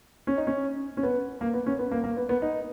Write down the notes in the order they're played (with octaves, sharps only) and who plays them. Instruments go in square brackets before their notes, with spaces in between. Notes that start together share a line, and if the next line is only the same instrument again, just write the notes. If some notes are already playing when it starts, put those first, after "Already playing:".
[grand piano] C#4
D#4
C#4
C#4
B3
A#3
B3
C#4
B3
A#3
A#3
B3
B3
D#4